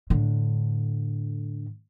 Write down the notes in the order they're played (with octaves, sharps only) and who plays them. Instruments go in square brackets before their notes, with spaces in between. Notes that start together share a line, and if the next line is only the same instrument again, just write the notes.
[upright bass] A2 D3